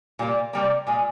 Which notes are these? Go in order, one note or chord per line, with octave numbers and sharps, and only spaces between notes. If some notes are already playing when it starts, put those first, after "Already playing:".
A#2 G3 A#3
C3 G3 A#3
A#2 G#3